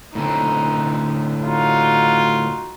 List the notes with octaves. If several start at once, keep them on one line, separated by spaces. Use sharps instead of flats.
A2 D3 C4 D#4
D#4 F4 F#4